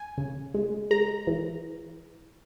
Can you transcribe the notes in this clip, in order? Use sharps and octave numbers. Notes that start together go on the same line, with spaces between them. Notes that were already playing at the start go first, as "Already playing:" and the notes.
Already playing: G#5
C#3
G#3
G#3 A#5
E3